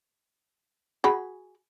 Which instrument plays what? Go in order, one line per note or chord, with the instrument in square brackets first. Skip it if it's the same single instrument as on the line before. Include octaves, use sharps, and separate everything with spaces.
[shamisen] F#4 G#4 B5